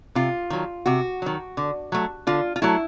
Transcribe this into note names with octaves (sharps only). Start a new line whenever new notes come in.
C3 F4
D#3 F#3
C3 F#4
D#3 F#3
D3
F#3 A3
D3 F4
F4
F#3 A3 E4